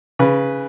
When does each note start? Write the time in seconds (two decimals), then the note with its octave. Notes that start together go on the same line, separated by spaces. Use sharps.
0.19 C#3 B4